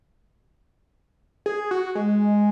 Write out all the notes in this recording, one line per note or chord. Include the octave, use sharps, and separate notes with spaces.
G#4
F#4
G#3